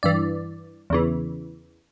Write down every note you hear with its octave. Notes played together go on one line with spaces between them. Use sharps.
G2 E3 D5
E2 C#3 E3